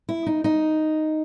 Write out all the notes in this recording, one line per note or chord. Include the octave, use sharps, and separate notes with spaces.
E4
D#4
D#4